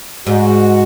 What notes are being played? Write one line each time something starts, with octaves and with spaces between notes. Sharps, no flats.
G#2 F#4